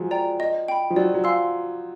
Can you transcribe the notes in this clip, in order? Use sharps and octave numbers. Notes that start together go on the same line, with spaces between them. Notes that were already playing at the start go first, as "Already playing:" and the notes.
Already playing: F3 F#3 G#3
D5 G5 A#5
D#5
G5 B5
F3
F#3 D5
F#3
F5 G#5 C6 E6